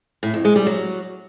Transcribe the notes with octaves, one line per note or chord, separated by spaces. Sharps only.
A2
F2
G#3
G3
F#3